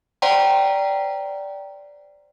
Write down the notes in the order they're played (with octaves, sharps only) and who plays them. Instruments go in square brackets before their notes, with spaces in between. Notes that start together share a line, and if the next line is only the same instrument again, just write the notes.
[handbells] C5 D5 F#5 G5 A#5 C6